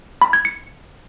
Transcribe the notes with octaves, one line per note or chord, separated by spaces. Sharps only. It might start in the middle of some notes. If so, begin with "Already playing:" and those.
B5
G#6
C#7